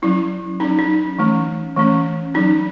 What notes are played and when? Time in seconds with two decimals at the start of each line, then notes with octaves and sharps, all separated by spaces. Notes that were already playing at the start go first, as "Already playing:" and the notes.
0.02 F#3 C#4 E4
0.60 F#3 C#4 D#4
0.79 D#4
1.19 E3 A3 C#4
1.76 E3 A3 C#4
2.34 F#3 C#4 D#4